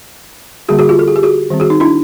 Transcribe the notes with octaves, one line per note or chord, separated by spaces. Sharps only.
D3 G3 A#3 F#4 G#4
F#4 G#4
F4 G4
A4
G#4
G4
F#4 G#4
D#3 G3 C4
F#4 G#4
D#4
D4 E4